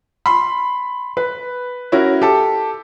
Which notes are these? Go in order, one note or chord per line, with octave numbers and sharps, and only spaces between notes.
B5 C6
B4
C#4 E4 F#4 A#4
G4 A4